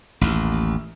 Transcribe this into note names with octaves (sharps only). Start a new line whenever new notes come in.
A1 D#2